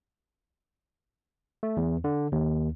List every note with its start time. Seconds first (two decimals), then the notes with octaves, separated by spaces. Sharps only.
1.63 A3
1.77 E2
2.04 D3
2.32 D#2